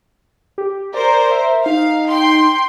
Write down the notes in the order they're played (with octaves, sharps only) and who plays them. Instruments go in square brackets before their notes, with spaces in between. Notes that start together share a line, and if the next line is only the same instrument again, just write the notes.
[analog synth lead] G4
[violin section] A#4 C5 [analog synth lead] D5
[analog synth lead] E5
[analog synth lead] D#4 [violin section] F5
[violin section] G5 C6